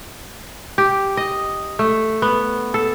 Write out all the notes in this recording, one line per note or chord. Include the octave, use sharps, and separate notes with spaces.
G4
D#5
A3
B3
A4